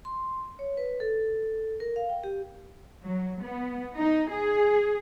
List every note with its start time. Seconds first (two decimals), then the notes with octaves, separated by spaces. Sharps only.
0.05 C6
0.59 C#5
0.77 B4
1.00 A4
1.80 A#4
1.96 F5
2.10 G5
2.24 G4
3.03 F#3
3.41 B3
3.97 D#4
4.31 G#4